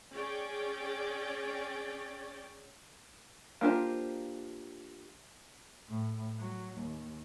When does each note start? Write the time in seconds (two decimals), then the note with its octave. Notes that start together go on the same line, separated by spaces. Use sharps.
0.11 C#4 G#4 C#5 D5 G5
3.61 A#3 D4 F4 G4 C5
5.89 A2
6.39 F#3
6.78 D#2